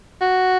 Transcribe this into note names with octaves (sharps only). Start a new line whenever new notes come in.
F#4